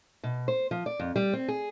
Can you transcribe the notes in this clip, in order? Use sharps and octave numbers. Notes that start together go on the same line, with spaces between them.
B2
C5
F3
D5
F2
G3
C4
G#4